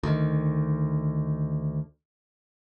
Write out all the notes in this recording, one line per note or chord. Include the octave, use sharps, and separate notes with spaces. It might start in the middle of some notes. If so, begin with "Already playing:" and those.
D2 D#3